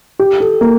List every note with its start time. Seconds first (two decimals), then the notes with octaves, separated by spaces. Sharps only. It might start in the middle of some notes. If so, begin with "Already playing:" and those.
0.19 G4
0.40 A4
0.61 A#3